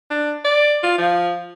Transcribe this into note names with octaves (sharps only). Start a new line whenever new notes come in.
D4
D5
F4
F3